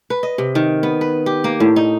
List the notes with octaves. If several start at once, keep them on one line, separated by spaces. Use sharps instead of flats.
B4
D#5
C3
D#3
B3
B4
G4
A#3
A2
D#4